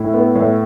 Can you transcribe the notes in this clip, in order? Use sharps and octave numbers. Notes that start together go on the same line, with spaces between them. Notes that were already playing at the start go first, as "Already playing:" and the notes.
Already playing: A2 E4
B3
A2